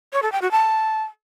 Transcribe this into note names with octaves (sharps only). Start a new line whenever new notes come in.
C#5
A4
G5
F#4
A5